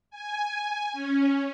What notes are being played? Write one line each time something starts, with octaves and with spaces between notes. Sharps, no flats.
G#5
C#4